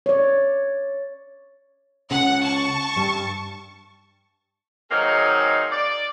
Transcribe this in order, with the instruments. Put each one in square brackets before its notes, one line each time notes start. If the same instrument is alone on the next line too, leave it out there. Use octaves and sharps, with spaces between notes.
[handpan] C#5 D5
[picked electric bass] C#2 C#3 [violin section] F#5
[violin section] A5 C#6
[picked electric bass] G2 G3
[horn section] D#3 F#3 A#3 C4 D#4 G#4
D5